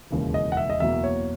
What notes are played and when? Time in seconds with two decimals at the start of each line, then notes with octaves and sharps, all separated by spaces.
0.10 E1 D#2 C#3 E3
0.34 D#5
0.52 F#5
0.57 E5
0.70 D#5
0.80 F#1 E2 B2 A#3 E5
1.04 C#5